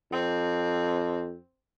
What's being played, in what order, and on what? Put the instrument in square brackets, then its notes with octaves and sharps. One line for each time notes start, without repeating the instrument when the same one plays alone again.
[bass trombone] F2 [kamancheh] C4